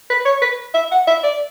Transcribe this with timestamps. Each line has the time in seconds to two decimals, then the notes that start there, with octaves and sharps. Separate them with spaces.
0.10 B4
0.25 C#5
0.42 B4
0.74 E5
0.92 F#5
1.07 E5
1.23 D5